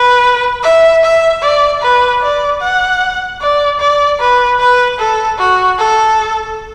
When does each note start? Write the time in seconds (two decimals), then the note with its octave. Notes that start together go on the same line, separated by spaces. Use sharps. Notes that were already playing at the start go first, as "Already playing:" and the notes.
Already playing: B4
0.63 E5
1.04 E5
1.43 D5
1.82 B4
2.22 D5
2.61 F#5
3.41 D5
3.80 D5
4.20 B4
4.60 B4
4.99 A4
5.39 F#4
5.79 A4